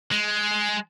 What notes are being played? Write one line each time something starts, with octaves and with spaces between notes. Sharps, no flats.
G#3